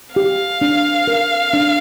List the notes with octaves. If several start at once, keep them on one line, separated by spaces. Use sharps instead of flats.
G4 F5
D4
A#4
D4